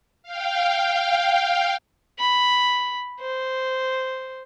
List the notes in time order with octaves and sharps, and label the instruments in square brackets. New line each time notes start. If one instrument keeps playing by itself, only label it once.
[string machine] F5 G5
[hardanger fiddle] B5
C5